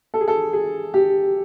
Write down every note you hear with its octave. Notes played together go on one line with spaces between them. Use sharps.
A4
G#4
A4
G#4
G4